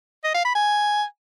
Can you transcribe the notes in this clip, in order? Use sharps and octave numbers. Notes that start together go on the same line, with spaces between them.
D#5
F5
B5
G#5